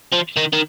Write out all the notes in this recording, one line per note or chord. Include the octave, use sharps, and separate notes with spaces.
F3
D#3
D#3